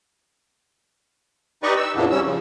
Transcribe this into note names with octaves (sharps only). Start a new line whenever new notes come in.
D#4 G4 B4 D5 D#5 C#6
E6
F2 A#2 C#3 E3 B3 D4
C3 G3 C#4 E6
C#3 F3